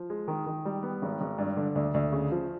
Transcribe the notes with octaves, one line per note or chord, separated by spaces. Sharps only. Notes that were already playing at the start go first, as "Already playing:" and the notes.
Already playing: F3
G#3
D#3
D#3
G3
B3
G#1
G#1
G2
D3
D2
D2
C#3
F3